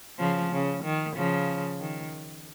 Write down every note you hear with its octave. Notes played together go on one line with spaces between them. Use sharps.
C#3 F3
C#3
D#3
C#3 F3
D#3